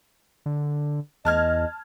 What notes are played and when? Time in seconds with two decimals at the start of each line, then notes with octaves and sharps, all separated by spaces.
0.46 D3
1.25 E2 D#5 A5 F6 G#6